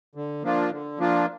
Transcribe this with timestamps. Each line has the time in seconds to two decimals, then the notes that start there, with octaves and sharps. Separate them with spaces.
0.15 D3
0.43 F3 A#3 D4 F4
0.71 D3
0.98 F3 A#3 D4 F4